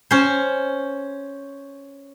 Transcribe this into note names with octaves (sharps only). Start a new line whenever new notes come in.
C#4 C5